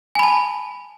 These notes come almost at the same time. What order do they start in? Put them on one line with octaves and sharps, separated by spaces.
G#5 B5 A5